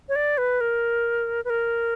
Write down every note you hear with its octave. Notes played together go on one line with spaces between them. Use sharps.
C#5
D5
B4
A#4
B4
A#4